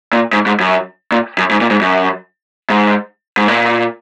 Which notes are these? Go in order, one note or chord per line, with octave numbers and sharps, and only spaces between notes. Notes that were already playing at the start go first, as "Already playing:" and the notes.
A#2
G#2
G#2
F#2
A#2
F#2
G#2
A#2
G#2
F#2
G#2
G#2
A#2